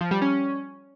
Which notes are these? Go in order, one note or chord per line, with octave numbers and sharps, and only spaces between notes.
F3
G3
C#4